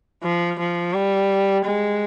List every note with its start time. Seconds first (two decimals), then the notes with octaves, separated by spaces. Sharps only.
0.24 F3
0.59 F3
0.94 G3
1.65 G#3